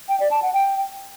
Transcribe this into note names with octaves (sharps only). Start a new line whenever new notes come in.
G5
D5
A5
F#5
G5